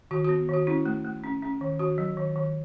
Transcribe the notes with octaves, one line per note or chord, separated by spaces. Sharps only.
D#3 F#4
B3 F#4
D#3 F#4
C#4 E4
A3
A3
C#4
C#4
D#3
D#3 F#4
F#3
D#3
D#3